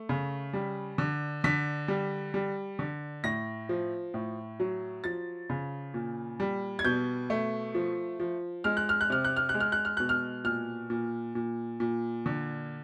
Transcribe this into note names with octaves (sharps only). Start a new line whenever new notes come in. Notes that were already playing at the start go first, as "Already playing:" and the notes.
Already playing: A3
C#3
G3
D3
D3 B6
G3
G3
D3
A2 A#6
F3
A2
F#3
F3 A6
C#3
A#2
G3
G#6
B2 G6
A3
F3
F3
G#3 F6
F#6
F6
F#6
C3 F6
F#6
F6
F#6
G#3
F6
F#6
F6
B2 F#6
F6
A#2 F6
A#2
A#2
A#2
D3